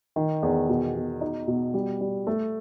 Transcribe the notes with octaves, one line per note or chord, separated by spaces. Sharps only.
D#3
E2
B2
B2
D#4
B2
G3
G3
A3